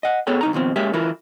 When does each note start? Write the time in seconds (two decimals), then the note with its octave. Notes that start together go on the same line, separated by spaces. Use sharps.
0.03 D#5 F#5
0.27 B3 G#4 A4 C#5 G5
0.41 C2 D#4 A#5
0.53 D#2 B2 F3 C4
0.76 G#3 A#3 C#4 G4 E5
0.93 E3 E4 F4 A#4